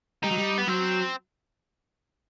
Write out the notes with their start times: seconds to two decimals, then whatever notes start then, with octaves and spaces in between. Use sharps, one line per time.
0.23 G3 D#4
0.31 F#3
0.38 G3
0.58 B3
0.68 F#3 C4